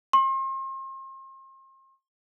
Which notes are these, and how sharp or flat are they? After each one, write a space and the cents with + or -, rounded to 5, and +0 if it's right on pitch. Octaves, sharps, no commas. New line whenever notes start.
C6 +40